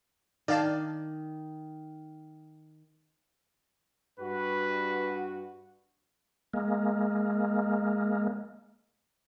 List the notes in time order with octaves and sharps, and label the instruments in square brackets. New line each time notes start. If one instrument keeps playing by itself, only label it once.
[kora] D#3 [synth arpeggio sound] D5 F5 A5
[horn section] G2 F#4 [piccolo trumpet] B4
[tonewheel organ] G#3 A#3